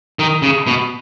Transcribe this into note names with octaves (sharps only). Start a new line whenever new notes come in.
D#3
C#3
B2